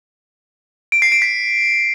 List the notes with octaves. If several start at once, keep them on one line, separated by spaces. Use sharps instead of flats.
D7
C7
D7
B6